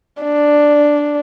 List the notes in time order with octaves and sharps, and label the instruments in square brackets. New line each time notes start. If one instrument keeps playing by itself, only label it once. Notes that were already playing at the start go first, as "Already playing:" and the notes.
[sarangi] D4